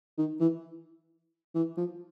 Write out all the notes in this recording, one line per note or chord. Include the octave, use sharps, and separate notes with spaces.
D#3
E3
E3
F3